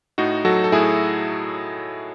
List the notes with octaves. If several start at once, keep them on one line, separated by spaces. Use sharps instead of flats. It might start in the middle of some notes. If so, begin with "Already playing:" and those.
A2 D#4 F#4
F#3 F#4 A4
A4
A2 E4 G#4